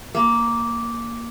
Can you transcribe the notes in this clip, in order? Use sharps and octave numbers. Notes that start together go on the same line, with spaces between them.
A#3